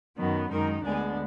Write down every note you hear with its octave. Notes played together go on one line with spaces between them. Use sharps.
F#2 D#3 F#3 B3
F#2 D#3 G#3 D#4 A#4
D2 D3 G#3 B3 D4 G#4